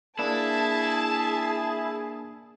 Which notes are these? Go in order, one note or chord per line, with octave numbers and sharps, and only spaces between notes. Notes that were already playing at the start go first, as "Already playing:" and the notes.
A#3 D4 E4 G#4 A5